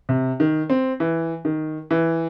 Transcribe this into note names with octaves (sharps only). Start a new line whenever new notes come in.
C3
D#3
C4
E3
D#3
E3